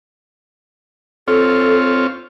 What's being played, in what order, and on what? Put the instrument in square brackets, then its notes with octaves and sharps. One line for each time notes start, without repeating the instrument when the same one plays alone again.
[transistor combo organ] C4 F4 C#5 [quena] A4